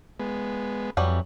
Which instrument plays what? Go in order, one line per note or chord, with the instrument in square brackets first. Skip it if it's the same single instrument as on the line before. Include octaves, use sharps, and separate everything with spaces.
[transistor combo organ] G#3 B3
[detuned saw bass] F2 [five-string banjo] E3 F#3 G3